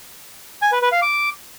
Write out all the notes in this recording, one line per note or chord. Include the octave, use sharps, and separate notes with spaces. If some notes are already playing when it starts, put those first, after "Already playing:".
G#5
B4
B4
F5
D6